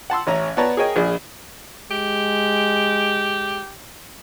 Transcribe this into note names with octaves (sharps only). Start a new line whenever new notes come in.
F#5 A5 C6 E6
A1 C#4 E5 A#5
B3 B4 C#5 D5 A5 A#5
G#4 A#4 C#5 D#5 G5 G#5
A#1 G#4 D5
G#3 G4